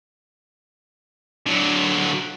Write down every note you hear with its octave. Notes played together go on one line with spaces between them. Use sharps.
D3 F#3